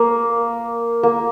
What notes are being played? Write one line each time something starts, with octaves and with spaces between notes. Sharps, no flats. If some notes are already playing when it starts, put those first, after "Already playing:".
Already playing: A#3
A#3